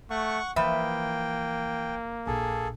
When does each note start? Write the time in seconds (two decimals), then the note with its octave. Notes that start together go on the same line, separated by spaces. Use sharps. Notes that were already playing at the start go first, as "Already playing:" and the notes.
0.10 A3 F#5 C#6
0.56 E3 F3 A#3 B4 E5 G5
2.27 A#1 G#4 A4